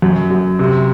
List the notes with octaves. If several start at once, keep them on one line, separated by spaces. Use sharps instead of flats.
F#2
F#2
C3